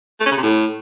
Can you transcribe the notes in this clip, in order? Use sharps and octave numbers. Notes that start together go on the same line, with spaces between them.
A3
C#4
C#3
C3
A2